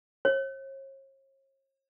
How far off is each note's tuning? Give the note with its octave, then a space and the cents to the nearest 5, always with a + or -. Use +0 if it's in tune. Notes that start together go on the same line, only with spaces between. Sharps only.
C#5 -45